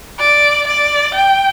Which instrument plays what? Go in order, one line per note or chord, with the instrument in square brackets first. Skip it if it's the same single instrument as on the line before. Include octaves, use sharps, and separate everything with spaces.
[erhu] D5
D5
G5